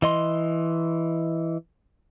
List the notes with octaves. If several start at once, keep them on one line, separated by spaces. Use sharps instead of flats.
E3 D#5 C6